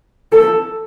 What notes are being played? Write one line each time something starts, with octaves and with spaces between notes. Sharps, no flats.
A4